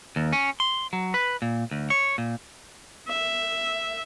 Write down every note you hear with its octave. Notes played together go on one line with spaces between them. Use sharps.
D#2
C#4
C6
F#3
B4
A#2
D2
C#5
A#2
E5